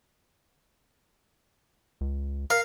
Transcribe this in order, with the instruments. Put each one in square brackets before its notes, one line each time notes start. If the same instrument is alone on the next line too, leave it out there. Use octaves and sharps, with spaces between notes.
[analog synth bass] C#2
[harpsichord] A#4 [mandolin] F5